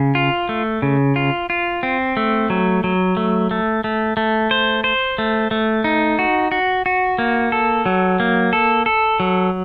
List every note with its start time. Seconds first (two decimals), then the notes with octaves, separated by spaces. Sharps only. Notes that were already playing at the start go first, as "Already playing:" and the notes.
Already playing: C#3
0.15 F4
0.49 A3
0.82 C#3
1.16 F4
1.50 F4
1.83 C4
2.17 A3
2.50 F#3
2.84 F#3
3.17 A3
3.51 A3
3.84 A3
4.17 A3
4.51 C5
4.84 C5
5.18 A3
5.51 A3
5.84 D#4
6.19 F#4
6.52 F#4
6.86 F#4
7.18 A#3
7.52 A4
7.86 F#3
8.20 A#3
8.53 A4
8.86 A4
9.20 F#3